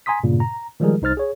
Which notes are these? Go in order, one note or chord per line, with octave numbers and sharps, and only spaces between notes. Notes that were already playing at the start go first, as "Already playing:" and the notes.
G#5 A#5 C6 D#6 B6
G2 A#2 C#3
A#5
D#3 F3 G3 G#3 G#4 A#4
C2 D#4 C5 F6 A6
G#4 C#5